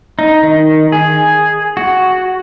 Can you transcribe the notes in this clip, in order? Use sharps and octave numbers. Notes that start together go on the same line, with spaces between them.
D#4
D#3
G#4
F#4